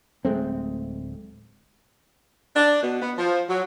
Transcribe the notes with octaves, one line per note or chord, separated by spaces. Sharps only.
D1 G#3 A3 C4
D4
B2
B3
F3
F#3